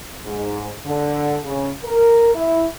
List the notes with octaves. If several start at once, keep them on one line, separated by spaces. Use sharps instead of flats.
G#2
D3
C#3
A#4
E4